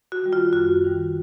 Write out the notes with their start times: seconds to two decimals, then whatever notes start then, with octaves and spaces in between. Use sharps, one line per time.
0.12 F#4
0.22 D#3 G3
0.33 F4
0.53 F#2 F#4
0.84 D#3 G3